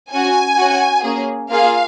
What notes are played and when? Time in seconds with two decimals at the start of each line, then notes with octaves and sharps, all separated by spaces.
0.12 C#4 F#4 G#5
0.58 C#4 F#4
1.04 A#3 C#4 G#4
1.49 A#3 F4 G#4 F5